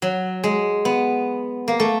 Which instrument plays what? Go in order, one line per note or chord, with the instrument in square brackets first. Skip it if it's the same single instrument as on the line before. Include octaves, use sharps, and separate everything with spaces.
[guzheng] F#3
G#3
B3
A#3
A3